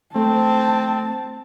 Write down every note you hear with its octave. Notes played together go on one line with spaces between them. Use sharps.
A3 C4 A5